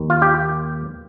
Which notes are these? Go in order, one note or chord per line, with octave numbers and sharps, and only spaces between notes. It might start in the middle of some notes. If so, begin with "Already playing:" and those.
Already playing: D#2 D#3
F4
G4